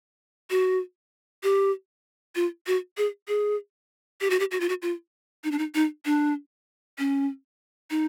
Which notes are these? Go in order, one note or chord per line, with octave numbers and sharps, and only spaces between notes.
F#4
G4
F4
F#4
G#4
G#4
G4
F#4
G4
F#4
F4
F#4
F4
D#4
D4
D#4
D#4
D4
C#4
D#4